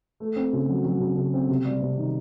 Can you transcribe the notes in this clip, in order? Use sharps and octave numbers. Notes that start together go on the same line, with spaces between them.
A3
C4
C#3
F#3
F#3
C#3
C#3
C4
C3
G3
C3
D#3